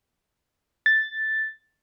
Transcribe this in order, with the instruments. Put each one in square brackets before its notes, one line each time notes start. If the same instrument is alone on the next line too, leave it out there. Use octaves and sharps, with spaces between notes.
[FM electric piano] A6